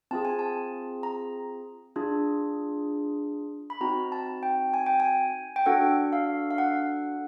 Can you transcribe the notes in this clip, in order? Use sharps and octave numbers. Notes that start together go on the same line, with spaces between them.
C4 F4 G#4 A5
G#5
A5
A#5
D4 F4 G#4
B5
C4 D#4 F#4 A#5
A5
G5
G#5
G5
G#5
G5
D4 F#4 A4 F#5
F5
F5
F#5